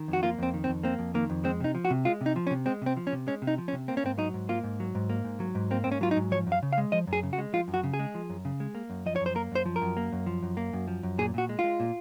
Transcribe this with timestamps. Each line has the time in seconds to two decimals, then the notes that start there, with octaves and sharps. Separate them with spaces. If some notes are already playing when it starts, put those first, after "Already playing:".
Already playing: D#3
0.08 F2
0.13 F#4
0.23 A#3 F4
0.38 F2 C4
0.54 D#3
0.64 C4
0.68 F2
0.83 A#3 C4
0.99 F2
1.14 D#3 A#3
1.30 F2
1.44 G#3 C4
1.60 C3 D#4
1.75 F3
1.85 F#4
1.90 C3
2.05 G#3 F4
2.21 C3
2.26 D#4
2.36 F3
2.47 C#4
2.51 C3
2.66 G#3 C4
2.82 C3 C4
2.97 F3
3.07 C#4
3.12 C3
3.27 G#3 C#4
3.42 C3
3.47 D#4
3.58 F3
3.68 C#4
3.73 C3
3.88 A#3 C4
3.97 C#4
4.04 G#2 C4
4.18 F#3 D#4
4.34 G#2
4.49 A#3 F4
4.64 G#2
4.80 F#3
4.95 G#2
5.10 A#3
5.24 G#2
5.40 F#3
5.55 G#2
5.71 A#3 C4
5.84 G#2 C4
5.92 C#4
6.01 F#3 F4
6.11 D#4
6.16 G#2
6.31 F3 C#5
6.47 F#2
6.52 F5
6.63 C#3
6.73 F5
6.78 G#3
6.92 F3 D#5
7.07 F#2
7.13 G#4
7.23 C#3
7.33 F#4
7.38 G#3
7.53 F3 F4
7.68 F#2
7.74 F#4
7.84 C#3
7.94 G#4
7.99 G#3
8.15 F3
8.30 F#2
8.45 C#3
8.60 G#3
8.75 A#3
8.90 F#2
9.06 F3 D#5
9.16 F#2 C#5
9.26 C5
9.35 A#3 A#4
9.52 F#2 C5
9.66 F3
9.76 A#4
9.82 F#2
9.97 A#3
10.12 F#2
10.26 F3
10.43 F#2
10.57 A#3
10.73 F#2
10.88 F3
11.03 F#2
11.18 A#2 G#4
11.34 A#2 F#4
11.49 G#3
11.59 F4
11.64 G#3
11.80 A#2